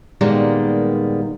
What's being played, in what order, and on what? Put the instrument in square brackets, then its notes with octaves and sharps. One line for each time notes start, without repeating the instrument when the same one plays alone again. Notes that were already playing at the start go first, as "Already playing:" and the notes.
[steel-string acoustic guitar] A#2 D#3 G3 G#3 A#3 B3